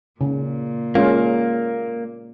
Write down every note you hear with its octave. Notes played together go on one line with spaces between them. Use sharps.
A#2 C#3
G#3 A#3 C#4 F4